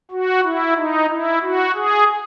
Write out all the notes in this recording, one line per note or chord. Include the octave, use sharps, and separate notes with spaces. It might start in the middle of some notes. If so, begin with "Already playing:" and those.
F#4
E4
D#4
E4
F#4
G#4